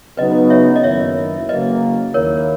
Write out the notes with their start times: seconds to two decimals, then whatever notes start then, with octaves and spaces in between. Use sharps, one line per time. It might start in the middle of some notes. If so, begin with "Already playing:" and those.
0.17 C#3 F#3 B3 D#4 B4 D#5
0.50 C#5 E5
0.76 D#5
0.83 F#2 D#3 A#3 E4 C#5 E5
1.49 C#3 F#3 A#3 B4 D#5
2.14 D#2 D#3 A#3 E4 A#4 C#5